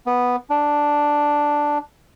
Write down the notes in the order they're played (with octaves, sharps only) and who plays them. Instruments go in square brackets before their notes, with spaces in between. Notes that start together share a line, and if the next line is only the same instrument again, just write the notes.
[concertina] B3
D4